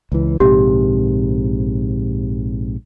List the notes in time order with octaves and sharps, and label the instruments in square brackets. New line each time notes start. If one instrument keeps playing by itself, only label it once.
[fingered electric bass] C#2 E3
[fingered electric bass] A#1 G#2 C3 [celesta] G4